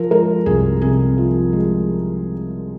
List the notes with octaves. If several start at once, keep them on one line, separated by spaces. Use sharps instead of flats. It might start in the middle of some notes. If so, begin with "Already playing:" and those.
Already playing: F3 A#4
G#3 A#4
C2 G#4
C3 G#4
F3
G#3